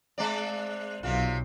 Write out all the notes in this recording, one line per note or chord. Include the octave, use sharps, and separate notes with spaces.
G#3 C4 D5
B1 C3 C4 F4